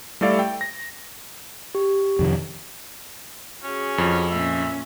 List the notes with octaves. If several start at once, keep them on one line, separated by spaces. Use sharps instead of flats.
G3 A3 E4 A4 D5 F5
G5
A#6
G4
F2 C3 D#3
C#4 F#4 G#4
F2
A#2 C#4 E5